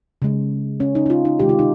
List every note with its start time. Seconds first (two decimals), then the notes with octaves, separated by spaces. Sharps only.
0.22 C#3 G#3
0.80 C#4
0.95 D#4
1.06 D#4
1.10 F4
1.25 D#4
1.39 C3 D#3 G#3 G4
1.49 F4
1.59 D#4